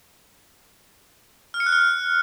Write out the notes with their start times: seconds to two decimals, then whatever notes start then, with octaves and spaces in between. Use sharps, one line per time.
1.54 F6
1.60 C#7
1.66 F#6
1.73 F6